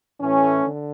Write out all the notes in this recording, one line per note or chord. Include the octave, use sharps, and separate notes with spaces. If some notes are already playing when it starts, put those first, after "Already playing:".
A2 E3 A3 C#4
D3